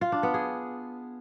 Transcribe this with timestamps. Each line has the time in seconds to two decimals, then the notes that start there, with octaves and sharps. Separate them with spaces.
0.01 F4
0.12 D4
0.23 B3
0.34 G#4